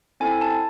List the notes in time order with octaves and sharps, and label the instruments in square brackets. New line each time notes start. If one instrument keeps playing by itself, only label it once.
[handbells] C4 E4 A4 G#5
A5